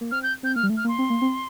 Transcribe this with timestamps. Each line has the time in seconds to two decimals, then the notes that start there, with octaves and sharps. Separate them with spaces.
0.01 A#3
0.11 C4 F6
0.23 G6
0.43 C4 G6
0.56 A#3 F6
0.63 G3
0.70 A3
0.77 F6
0.84 A#3
0.88 C6
0.99 C4
1.10 A#3
1.22 C4